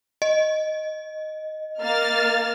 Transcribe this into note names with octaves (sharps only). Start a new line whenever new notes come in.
D#5
A#3 F6 A6